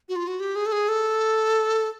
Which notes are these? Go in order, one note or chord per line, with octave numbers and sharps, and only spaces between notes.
F#4
F4
F#4
G4
G#4
A4
G#4
A4